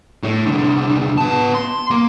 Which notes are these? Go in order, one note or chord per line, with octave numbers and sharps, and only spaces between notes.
A2 A3
C2 D3
B3 A5
C6
A#3